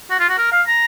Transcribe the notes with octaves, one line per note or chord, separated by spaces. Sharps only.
F#4
F4
F#4
A#4
F5
A#5